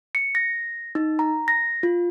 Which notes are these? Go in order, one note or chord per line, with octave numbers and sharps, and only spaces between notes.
C#7
A#6
D#4
A#5
A#6
F4